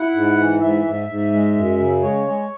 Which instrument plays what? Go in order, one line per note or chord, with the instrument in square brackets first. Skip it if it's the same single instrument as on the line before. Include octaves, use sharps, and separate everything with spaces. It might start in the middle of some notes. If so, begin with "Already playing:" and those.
Already playing: [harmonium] E4 F#5
G#2
E3
G#2 E5
G#2
G#2
G#3
F#2
C#3
G#3 C#5
G#3